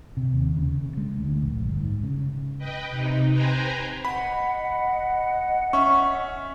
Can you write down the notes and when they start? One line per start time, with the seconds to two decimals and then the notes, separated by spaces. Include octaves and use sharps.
0.17 C3
0.33 D#2
0.57 C#3
0.82 C#3
0.97 G#3
1.19 D2
1.42 A#1
1.64 G1
1.81 G#2
2.03 C#3
2.58 B4 D#5 G5
2.89 C3 D#4
3.32 B4 C5 G5 G#5 A#5
4.05 D#5 F#5 B5
5.73 C#4 E5 C#6